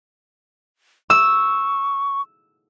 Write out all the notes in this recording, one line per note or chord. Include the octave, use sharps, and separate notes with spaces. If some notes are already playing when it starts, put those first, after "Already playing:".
C#6 E6